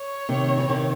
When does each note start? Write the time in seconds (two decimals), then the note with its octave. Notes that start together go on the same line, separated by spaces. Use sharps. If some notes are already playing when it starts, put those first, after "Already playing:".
Already playing: C#5
0.29 C3 D#3
0.57 E3
0.69 C3 D#3